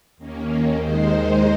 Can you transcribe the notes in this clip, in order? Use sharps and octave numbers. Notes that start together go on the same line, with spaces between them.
D#2 D#3 A#3 C#4
D#2 D#3 G#3 D#4 C5